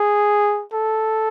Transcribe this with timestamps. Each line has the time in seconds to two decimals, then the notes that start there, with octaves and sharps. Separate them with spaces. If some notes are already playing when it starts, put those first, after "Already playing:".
Already playing: G#4
0.73 A4